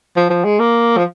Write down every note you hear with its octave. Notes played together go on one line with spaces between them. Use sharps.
F3
F3
G#3
A#3
F3